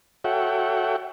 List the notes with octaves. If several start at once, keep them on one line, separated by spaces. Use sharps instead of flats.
F#4 A4 C#5 E5 F#5 G5